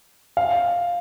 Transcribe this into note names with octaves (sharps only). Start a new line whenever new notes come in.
F5